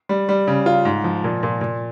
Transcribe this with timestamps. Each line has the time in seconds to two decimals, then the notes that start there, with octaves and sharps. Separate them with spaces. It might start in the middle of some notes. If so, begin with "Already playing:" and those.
0.09 G3
0.29 G3
0.48 C#3
0.66 F4
0.85 G#2
1.04 F3
1.24 A#2
1.43 A#2
1.61 A#2